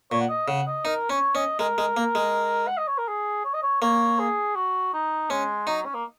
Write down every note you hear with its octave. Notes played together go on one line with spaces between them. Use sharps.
A#2 C#5
F#5
D#5
C#3 F#5
D#5
D#4 A#4
C#4 C#5
C#4 D#5
G#3 A#4
G#3
A#3
G#3
F#5
D#5
C#5
A#4
G#4
C#5
D#5
C#5
A#3 C#5
G#4
F#4
D#4
G#3 C#4
F#3 D#4
C#4
A#3